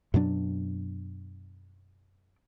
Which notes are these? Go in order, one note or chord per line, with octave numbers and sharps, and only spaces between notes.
F#2 B2 F#3 D4